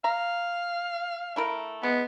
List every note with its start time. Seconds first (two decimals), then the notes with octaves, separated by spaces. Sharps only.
0.04 F5 A#5
1.36 A3 E4 A#4
1.83 G#3 B3